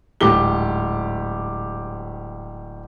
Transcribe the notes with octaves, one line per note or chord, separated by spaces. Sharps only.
D1 G#2 G4 G7